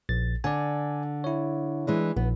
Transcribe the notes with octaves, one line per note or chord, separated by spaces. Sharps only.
A#1 A6
D3 D5 G#5
E4 C#5
E3 G#3 D4
A#1 B3